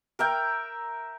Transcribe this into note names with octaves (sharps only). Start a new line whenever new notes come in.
A#4 E5 G5